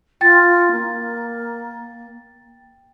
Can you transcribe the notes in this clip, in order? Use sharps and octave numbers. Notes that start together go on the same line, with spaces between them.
F4 G5 A6
A#3